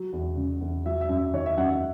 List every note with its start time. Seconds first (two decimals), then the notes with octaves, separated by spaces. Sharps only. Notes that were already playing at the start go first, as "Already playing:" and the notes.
Already playing: F#3
0.13 E2
0.37 C#3
0.61 E2
0.86 F#3 E5
1.01 E5
1.09 F#2
1.17 E5
1.33 D#3 C#5
1.46 E5
1.57 F#2 F#5
1.70 E5